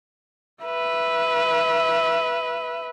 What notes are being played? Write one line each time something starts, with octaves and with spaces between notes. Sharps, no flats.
B4 E5